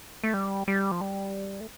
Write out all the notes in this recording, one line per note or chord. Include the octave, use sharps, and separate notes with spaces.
A3
G3
G3
F3
G3
A3